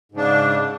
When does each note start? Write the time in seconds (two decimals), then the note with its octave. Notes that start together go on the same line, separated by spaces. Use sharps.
0.12 G#2
0.14 C#3
0.17 D4